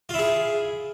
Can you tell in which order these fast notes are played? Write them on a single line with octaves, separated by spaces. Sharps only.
F4 E4 G#4